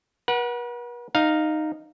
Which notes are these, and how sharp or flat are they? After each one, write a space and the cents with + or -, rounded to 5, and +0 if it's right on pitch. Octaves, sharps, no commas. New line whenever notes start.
B4 -45 F#5 +0
D#4 -10 F5 +0